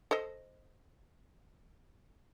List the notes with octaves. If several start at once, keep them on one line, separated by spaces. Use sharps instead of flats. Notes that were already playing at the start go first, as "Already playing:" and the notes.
A4 C5 D#5